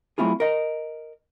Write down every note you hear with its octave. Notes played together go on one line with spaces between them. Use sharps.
F#3 A3 C4 E4 F4 G#4
A#4 D#5